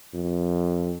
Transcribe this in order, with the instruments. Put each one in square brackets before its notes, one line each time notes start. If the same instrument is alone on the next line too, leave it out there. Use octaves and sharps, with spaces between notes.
[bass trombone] F2